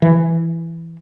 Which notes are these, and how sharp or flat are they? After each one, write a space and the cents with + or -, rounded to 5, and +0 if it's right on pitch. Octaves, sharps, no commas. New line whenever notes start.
E3 +10